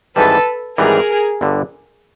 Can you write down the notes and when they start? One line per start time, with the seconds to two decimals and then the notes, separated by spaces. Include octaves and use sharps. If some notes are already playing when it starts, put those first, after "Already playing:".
0.16 G#1 G#2 E3 G3 A4 B4
0.78 G#1 G#2 E3 G3 G#4 A#4
1.41 G1 G2 D3